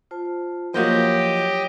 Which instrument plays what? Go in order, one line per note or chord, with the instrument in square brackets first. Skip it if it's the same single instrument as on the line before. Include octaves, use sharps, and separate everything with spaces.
[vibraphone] F4 C5 A5
[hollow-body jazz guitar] F3 A#3 F#4 [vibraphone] F#3 C#5 [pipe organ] G4 D#5 G5